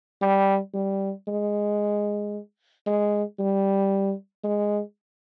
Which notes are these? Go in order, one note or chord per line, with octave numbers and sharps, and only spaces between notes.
G3
G3
G#3
G#3
G3
G#3